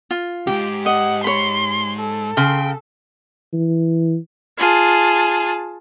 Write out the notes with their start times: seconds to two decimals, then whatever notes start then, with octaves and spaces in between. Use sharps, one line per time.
0.11 F4
0.47 E2 G#2 G4
0.86 D#5 F#5
1.24 C#5 B5 C6
2.00 A4
2.37 C#3 G5 C6
3.53 E3
4.58 F4 G#4 A5